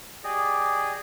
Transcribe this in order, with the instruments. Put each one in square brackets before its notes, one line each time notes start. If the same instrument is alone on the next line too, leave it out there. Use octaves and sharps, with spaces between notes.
[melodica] G4 G#4 D5 D#5